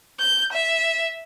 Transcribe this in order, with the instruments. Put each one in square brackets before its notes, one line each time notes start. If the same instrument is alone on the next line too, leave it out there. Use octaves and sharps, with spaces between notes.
[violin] G6
E5